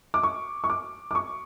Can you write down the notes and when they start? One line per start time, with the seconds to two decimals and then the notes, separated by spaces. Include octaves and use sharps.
0.14 D6
0.23 C#6
0.64 C#6
0.70 D6
1.11 D6
1.15 C#6